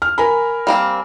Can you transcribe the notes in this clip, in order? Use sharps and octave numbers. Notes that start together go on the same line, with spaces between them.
F6
A#4 G#5 B5
G3 A#3 C4